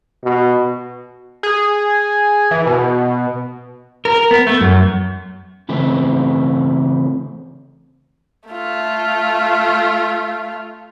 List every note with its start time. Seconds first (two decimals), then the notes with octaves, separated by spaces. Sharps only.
0.24 B2
1.43 G#4
2.51 E3
2.66 B2
4.05 A#4
4.31 B3
4.47 A3
4.61 F#2
5.69 C#3 E3 A3 C4
8.49 A3 F4